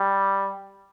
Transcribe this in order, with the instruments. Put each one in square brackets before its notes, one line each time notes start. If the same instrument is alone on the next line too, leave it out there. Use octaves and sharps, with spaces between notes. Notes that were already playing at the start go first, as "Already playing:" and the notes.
Already playing: [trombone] G3